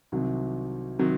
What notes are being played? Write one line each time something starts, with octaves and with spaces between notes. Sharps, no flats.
C2 C3 D#3 F#3
C3 D#3 F#3